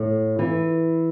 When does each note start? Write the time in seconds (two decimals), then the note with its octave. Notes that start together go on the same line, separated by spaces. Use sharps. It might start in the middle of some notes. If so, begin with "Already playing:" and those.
Already playing: A2
0.39 E3